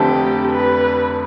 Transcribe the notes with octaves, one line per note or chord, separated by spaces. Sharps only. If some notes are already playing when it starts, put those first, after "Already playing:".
Already playing: F1 F2 D3 A3 C4 G4
B4